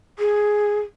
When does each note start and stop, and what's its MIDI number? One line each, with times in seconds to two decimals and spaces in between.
0.19 0.80 68